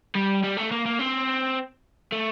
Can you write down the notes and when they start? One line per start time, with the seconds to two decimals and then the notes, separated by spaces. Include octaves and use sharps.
0.15 G3
0.44 G3
0.57 A3
0.71 A#3
0.86 A#3
0.99 C4
2.12 A3